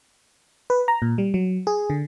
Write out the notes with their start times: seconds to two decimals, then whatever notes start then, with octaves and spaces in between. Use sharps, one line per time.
0.70 B4
0.88 A#5
1.02 A#2
1.18 G3
1.34 F#3
1.67 G#4
1.90 D3